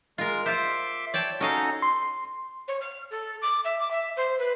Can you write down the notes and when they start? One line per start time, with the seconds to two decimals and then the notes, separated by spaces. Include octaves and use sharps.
0.18 G#3 F4 A#4 F6
0.46 F4 C5 E5 C6 D6
1.14 C#5 D5 G5 A5
1.41 C#4 D#4 F#4 A4 D#5 F5
1.82 C6
2.67 C#5
2.80 F6
3.10 A4
3.41 D6
3.64 E5
3.78 D6
3.90 E5
4.16 C5
4.38 B4